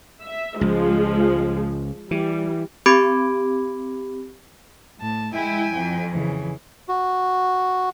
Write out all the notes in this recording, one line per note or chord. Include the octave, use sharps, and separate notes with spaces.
E5
C#2 F3 G#3
E3 G3
C4 G4 B5 D6 G#6 D7
A2 A5
G#3 E4 G5 G#5
F2
C#3 E3
F#4